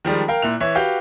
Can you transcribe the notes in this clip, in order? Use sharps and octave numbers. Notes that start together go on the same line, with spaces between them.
D#3 F3 G3 G#3
A#4 F5 G5
A#2 E4 F#6 F7
E3 C#5 E5
F#4 G4 B4 F5 G6